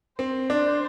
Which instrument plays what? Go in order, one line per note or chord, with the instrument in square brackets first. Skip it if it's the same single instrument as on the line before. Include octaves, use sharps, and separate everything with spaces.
[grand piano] C4 [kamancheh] C5
[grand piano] D4